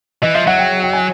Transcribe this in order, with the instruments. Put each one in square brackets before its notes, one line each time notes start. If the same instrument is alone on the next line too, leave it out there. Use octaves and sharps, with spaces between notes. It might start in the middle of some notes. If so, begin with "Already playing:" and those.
[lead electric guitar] E3 [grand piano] D#5
[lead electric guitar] F3 [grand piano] E5
[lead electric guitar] F#3 [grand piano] F#5
[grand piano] G5
G5
G#5